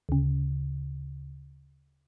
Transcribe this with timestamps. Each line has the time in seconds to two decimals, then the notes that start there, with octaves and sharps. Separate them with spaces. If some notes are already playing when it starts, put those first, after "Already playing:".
0.09 D2 C#3